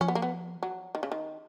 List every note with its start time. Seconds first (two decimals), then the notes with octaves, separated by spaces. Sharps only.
0.01 F3 C#4
0.08 B3
0.15 A#3
0.22 B3
0.63 F#3
0.95 D#3
1.03 C#3
1.12 D#3